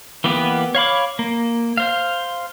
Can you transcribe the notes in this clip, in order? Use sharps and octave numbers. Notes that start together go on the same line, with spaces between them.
E3 A#3 B3 G4 B4
C#5 F5 B5 D6
A#3
C5 F5